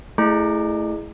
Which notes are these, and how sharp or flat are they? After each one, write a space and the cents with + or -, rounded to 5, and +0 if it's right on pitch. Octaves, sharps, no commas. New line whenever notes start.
A3 +0 E4 +0 G#4 +0